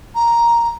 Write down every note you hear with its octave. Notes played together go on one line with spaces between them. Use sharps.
A#5